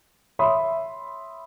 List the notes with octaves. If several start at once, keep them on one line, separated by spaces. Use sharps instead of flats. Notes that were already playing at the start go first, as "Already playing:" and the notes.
C#5 E5 B5 C6 D#6